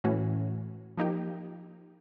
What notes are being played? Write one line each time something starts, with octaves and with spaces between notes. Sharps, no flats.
A2 E3 A3 C#4 F#4
F3 A#3 D#4 G4